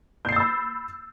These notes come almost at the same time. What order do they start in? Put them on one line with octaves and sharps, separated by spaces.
G6 C7 A6 E6 B5